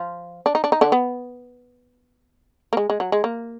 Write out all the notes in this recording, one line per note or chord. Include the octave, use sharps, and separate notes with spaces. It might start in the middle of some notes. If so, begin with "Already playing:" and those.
Already playing: F3 F4
D4
D#4
D4
D#4
D3 D4
B3
A#3
G#3
G#3
F#3
G#3
A#3